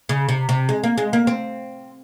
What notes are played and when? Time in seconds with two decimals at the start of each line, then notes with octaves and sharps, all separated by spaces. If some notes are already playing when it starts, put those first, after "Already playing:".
0.09 C#3
0.29 C3
0.49 C3
0.69 G#3
0.84 A#3
0.98 G#3
1.13 A#3
1.27 C4